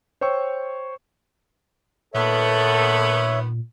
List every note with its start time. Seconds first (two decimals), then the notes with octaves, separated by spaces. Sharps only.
0.21 C5 C#5 G5 C#6 E6
2.14 A#2 D#3 B3 A4 C#5 E5